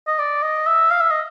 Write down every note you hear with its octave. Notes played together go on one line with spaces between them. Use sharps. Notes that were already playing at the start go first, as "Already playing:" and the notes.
D#5
D5
D#5
E5
F5
E5
D#5